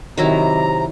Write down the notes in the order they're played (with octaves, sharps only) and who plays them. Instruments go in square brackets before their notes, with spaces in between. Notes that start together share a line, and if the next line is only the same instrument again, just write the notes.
[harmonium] C3 A#5 [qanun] D#3 F#3 E4